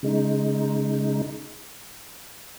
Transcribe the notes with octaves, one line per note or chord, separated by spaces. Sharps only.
C#3 G#3 D#4